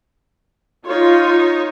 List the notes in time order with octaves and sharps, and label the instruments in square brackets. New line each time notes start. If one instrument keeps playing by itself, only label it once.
[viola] D#4 C#5 [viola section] F4